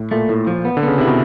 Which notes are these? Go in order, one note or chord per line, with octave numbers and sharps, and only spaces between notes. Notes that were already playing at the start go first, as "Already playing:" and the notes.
Already playing: A2
A#2 A3
A2
F3
B3
D3
C#3 B3
C3 E4
B2